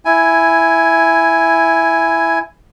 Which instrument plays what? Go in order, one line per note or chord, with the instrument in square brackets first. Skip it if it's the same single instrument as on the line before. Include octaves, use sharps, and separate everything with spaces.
[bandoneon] E4 G#5